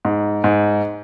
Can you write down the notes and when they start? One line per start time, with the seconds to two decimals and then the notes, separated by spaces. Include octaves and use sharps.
0.05 G#2
0.44 G#2